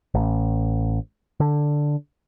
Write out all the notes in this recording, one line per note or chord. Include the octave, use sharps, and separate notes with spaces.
A1
D3